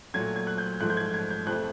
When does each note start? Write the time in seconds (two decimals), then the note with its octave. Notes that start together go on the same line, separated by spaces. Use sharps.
0.14 A#2 F#3 A3 G#6
0.36 G#6
0.47 F#6
0.58 G6
0.80 G#2 F3 A3 F#6
0.90 G6
0.97 G#6
1.14 G#6
1.30 G6
1.47 F2 C3 F3 A3 F#6